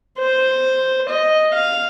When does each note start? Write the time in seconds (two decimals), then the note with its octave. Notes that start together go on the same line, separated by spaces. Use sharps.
0.18 C5
1.09 D#5
1.54 F5